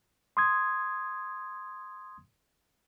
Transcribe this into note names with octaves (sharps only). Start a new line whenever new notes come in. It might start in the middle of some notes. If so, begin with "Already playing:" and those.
C6 D#6 G#6